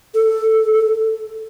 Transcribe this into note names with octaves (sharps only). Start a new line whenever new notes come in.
A4
A4